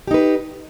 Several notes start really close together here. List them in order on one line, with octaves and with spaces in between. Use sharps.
G4 D#4 B4